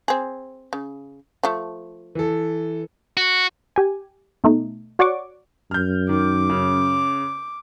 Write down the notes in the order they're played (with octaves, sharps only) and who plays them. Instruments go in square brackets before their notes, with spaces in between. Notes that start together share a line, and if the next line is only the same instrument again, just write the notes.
[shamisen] C4 G#4
C#3
F3 A3
[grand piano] E3 A4
[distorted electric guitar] F#4
[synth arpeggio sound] G4 G#5
B2 A3 D#4
F#4 C#5 D5 F#5 C#6 D6
[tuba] F#2 [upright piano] F6 G6
[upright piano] D#3 [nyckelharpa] D6
[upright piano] C#3